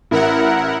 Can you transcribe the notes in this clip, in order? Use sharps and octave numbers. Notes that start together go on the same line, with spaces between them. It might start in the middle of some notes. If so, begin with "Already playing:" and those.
A1 E4 A#4 F#5